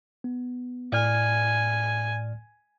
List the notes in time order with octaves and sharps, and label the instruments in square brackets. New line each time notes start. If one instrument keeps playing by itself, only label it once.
[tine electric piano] B3
[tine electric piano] A2 D5 F6 [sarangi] G#5